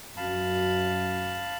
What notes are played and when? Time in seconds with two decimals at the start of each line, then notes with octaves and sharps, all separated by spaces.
0.17 F#2 F5 A5 B5